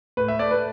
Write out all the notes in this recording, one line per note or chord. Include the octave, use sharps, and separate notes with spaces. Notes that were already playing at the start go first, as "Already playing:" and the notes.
A2 B4
E5
A3 D5
B4